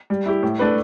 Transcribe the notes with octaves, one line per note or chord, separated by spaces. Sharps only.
G3
E4 G4
A2
A3 D4 B4